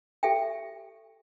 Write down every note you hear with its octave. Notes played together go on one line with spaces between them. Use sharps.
G4 A4 E5 G5